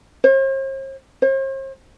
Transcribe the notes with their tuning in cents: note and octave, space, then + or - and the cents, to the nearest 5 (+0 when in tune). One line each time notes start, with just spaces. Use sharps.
C5 +45
C5 +45